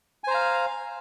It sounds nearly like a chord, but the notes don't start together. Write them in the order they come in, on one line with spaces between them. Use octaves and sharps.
G#5 C5 A#5 F5